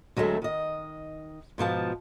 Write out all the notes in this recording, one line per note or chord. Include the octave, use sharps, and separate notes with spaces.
D2 F#3 G#3 A3 E5
D#3 D#5
G#2 B2 F3 A5